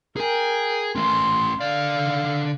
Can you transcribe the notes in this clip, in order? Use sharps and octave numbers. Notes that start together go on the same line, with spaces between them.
G#4 A#4 G5 G#5
A3 C#4 C6
D3 D5 F5